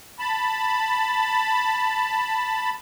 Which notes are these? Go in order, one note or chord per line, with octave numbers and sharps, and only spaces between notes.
A5 B5